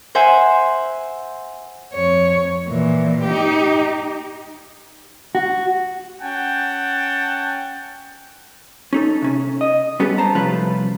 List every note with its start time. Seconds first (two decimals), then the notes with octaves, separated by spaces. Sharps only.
0.15 C5 E5 F#5 G#5
1.94 F2 C#5
2.69 A#2 E3
3.24 D#4 G4
5.35 F#4
6.22 C#4 F#5 G5 A5
8.93 C#4 D#4 A4
9.22 C3 C#4
9.61 D#5
10.00 G3 B3 C#4 G4 A4
10.18 C5 A5 A#5
10.35 C2 F3 A3 C#4 F4 B4